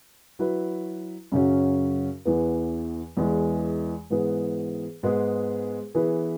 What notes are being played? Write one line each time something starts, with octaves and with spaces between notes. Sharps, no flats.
F#3 E4 B4
F#2 C#3 F#3 C#4 F#4
E2 E3 B3
E2 E3 G#3
G#2 E3 B3 G#4 B4
G#2 G#3 B3 G#4
E3 B3 E4 G#4 B4